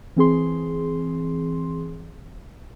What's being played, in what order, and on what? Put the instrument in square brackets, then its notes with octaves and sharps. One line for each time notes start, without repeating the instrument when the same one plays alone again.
[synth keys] E3 C4 G#4 C6